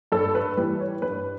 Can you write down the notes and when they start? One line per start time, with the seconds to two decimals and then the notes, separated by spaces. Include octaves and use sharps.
0.12 G2 A4
0.35 B4
0.57 E3 G3 B4
0.80 C#5
1.02 G2 B4